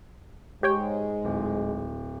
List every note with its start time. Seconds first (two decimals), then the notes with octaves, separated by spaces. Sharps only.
0.63 G#2 G#3 G4 C#5 G5
1.25 D1